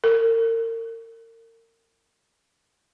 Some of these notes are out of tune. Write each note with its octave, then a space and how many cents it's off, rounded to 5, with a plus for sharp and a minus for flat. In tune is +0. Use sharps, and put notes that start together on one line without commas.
A#4 -35